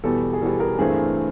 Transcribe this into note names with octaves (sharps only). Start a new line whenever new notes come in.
E2 B2 G3 A4
G#4
E2 B2 G3 A4
G#4 A#4
G2 E3 A3 C4 G#4 A#4